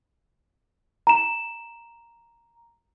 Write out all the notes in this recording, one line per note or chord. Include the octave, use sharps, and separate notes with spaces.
A#5 E7